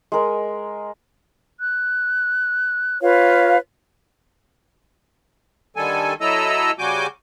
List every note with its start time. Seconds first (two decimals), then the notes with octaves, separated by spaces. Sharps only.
0.12 G#3 A#4 D#5
1.61 F#6
3.02 F4 B4 C#5 F5
5.76 D3 D#3 G3 A4 G#5
6.21 F#3 E4 A4 D#5 A#5 E6
6.79 C#3 G3 F#4 G#5 D6 G6